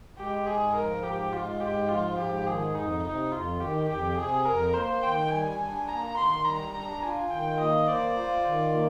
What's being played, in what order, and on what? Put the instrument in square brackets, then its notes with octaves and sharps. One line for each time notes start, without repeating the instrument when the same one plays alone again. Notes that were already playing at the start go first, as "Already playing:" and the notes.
[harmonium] G#3 [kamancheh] G4
[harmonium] G#2 [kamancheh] G#4
[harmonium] F3 [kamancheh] A#4
[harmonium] G#2 [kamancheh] G4
[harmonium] G#3 [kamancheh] F4
[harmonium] G#2 [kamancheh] G4
[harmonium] F3 [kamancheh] F4
[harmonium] G#2 [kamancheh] G4
[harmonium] D#3 [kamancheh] G#4
[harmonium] F2 [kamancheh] D#4
[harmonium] C3 [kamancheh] D#4
[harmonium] F2 [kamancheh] F4
[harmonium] D#3 [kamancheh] G4
[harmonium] F2 [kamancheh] G4
[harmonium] C3 [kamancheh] G#4
[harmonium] F2 [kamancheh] A#4
[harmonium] A#3 [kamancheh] C5
[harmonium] D#3 [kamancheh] G5
[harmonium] G3 [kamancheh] G#5
[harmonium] D4
[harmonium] A#3 [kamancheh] A#5
[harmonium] D#3 [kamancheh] C6
[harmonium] G3 [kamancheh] A#5
[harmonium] D4
[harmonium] F4 [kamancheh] G#5
[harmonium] D#3 [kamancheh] G5
[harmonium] A#3 [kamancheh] D#5
[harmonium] C5 [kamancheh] D5
[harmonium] F4
D#3
A#3